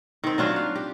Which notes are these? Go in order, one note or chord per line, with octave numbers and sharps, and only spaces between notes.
D#3 C4
F#3 D4 F4 F#4
F5
G4